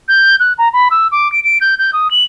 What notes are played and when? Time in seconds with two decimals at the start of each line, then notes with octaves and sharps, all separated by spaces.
0.08 G6
0.40 F#6
0.58 A#5
0.73 B5
0.91 E6
1.12 D6
1.32 D7
1.44 D7
1.61 G6
1.79 G6
1.93 D#6
2.11 F#7